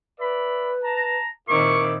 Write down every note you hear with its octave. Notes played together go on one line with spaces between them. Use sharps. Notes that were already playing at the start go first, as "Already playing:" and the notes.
B4 D5 E5 B5
A5 A#5
A#2 D#3 C4 E4 A#4 C#6 D6